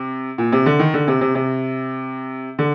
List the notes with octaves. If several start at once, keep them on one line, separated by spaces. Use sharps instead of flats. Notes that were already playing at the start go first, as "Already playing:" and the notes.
Already playing: C3
A#2
C3
D3
D#3
D3
C3
C3
C3
D3